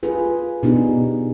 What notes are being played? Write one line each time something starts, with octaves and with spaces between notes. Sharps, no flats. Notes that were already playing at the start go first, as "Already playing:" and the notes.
F4 G#4 B4
B2 B3 D4 D#4 G4 G#4